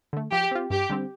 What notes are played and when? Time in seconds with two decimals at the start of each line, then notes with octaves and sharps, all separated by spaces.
0.13 D3 A3
0.32 F3 G4
0.51 C4 F4
0.70 G2 G4
0.90 D3 G3 C4